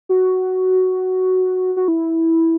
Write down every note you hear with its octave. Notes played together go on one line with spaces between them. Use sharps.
F#4
F#4
E4